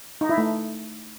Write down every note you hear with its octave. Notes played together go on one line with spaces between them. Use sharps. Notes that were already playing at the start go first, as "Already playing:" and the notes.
D#4
E4
A3